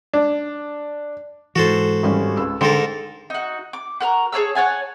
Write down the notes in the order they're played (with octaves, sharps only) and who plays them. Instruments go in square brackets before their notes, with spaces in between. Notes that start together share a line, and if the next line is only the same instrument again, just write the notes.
[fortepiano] D4
[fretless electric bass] G#2 E3 [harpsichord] F#4 A4 C5
[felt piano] G#1 G3 C#4
C#2 E6
[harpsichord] G#2 A4 A#4 [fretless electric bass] D3 [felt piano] G5 C6
[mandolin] D#4 F#4
D6
F#4 A#4 A#5
G#4 C#5 A5 E6
C#5 F#5 G#5 A5